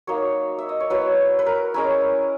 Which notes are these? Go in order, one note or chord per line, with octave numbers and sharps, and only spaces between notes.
F#3 A#3 D#4 C#5
E5
D#5
C#5
F#3 B3 E4 B4
B4
A#4
G#3 C#4 E4 A#4